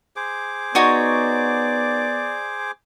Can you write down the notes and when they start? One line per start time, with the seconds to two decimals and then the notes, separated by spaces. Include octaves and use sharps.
0.16 G#4 C5 D6
0.75 B3 D#4 F#4 C#5 D5